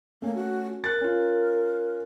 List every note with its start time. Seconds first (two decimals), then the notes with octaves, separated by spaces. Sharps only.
0.22 A3 A#3 C#4
0.35 F#4
0.84 A#4 F#6 A6
1.01 C#4 F4